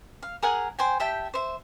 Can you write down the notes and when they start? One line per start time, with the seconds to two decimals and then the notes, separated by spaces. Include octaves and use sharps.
0.23 F5
0.42 G#4 A#4 F#5 G#5
0.79 C5 G5 G#5
1.00 G4 E5 G5 A5
1.34 C5 E5